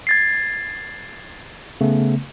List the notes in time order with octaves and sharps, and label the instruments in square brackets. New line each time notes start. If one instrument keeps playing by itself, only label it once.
[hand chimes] G#6 A6 C7
[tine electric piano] C#3 A3 B3